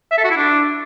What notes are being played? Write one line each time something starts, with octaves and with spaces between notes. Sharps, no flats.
E5
A4
F#4
E4
D4